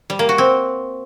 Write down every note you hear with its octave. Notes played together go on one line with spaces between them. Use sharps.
G3
A#3
F#4
C4